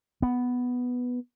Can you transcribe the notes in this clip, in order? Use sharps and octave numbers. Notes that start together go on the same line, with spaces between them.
B3